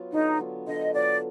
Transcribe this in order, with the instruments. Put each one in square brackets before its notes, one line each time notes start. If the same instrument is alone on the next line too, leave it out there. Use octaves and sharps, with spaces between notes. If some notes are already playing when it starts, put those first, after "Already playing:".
Already playing: [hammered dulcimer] F#3 B3 F4
[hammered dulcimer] D3 [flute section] D#4
[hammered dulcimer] F#3 B3 F4
[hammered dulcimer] D3 [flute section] D#5
[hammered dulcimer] F#3 B3 F4 [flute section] D5